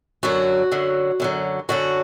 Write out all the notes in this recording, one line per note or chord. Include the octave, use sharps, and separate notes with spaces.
F#2 D3 F#3 F#4
F#2 D3 F#3
F#2 D3 F#3
F#2 D3 F#3 F#4